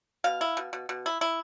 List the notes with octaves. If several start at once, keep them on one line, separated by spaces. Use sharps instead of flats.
B2 F5
E4
B2
B2
B2
E4
E4